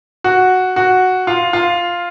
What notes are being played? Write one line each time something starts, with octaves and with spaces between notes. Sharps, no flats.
F#4
F#4
F4
F4